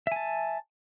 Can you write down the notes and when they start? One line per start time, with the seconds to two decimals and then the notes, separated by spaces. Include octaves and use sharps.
0.07 E5
0.12 G#5
0.16 A5